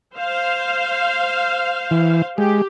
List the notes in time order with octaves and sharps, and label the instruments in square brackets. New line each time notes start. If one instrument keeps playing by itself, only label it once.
[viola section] C5 F5
[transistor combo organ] E3
[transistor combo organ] G#3 [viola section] G4